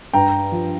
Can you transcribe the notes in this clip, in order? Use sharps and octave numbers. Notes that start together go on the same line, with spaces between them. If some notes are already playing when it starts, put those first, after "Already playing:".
G2 G5 A#5
F3